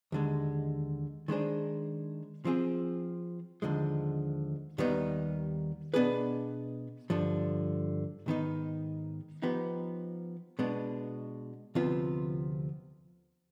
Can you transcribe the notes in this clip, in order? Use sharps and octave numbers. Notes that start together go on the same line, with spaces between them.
D#2 D3 G#3
D#3 G#3 D4 G#4 C5
F3 C4 F4 G#4
D#2 D3 F3 G#3
D#2 D#3 G3 B3 D#4
B2 B3 D4 G#4 B4
G2 D3 F3
G#2 D#3 B3 D#4
F3 B3 D#4 G4
B2 G#3 B3 D4
D2 C3 F3 B3 F4